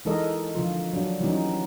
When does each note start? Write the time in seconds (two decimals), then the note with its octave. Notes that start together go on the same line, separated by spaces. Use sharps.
0.05 E3 G#3 D#4 A4 A#4 D#5
0.55 D3 F3 F4
0.93 F#3 D4
1.21 E3 F#3 G3 A#3 C#4 D#4